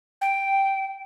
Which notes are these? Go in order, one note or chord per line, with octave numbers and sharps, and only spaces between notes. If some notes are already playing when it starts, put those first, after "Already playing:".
G5